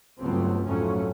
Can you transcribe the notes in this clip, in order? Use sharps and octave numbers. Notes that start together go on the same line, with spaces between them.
C#2 G2 F#3 A3 B3 C4
A#1 F2 G#2 F#3 A3 C#4